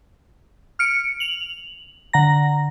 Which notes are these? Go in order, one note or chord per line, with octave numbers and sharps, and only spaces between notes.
F6 C#7 D7
F7 F#7
D3 F#5 A#5 A#6